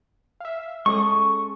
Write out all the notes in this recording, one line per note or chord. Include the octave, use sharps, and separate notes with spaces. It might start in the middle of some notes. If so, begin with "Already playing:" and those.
E5 F5
G#3 C#4 A4 C#6 D#6